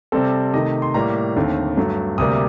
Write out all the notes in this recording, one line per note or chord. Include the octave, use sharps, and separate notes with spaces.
C3 G3 C4 A4
C3 D#3 A3 D#5
C6
A2 G3 A#3 A#5
D#2 D3 A3 C4
G2 F#3 A3
D2 C3 G3 A#3 D#6